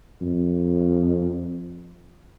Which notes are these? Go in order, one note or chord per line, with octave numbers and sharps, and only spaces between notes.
F2